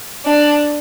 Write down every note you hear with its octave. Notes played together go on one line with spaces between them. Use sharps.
D4